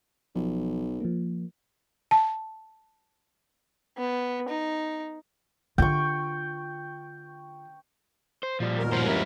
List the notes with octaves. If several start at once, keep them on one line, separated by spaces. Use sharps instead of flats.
B1 F3
F3 A#3
A5
B3
D#4
D3 F4 G5 C#6
C5
A#2 F3 G3 F4 D5
D#2 B2 A#4
G2 F3 C5
G#3 C#4 E4